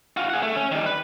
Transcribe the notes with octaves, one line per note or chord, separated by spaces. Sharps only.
F4 F#4
G#4 F#5
A3
C#4
D#3 G3
B4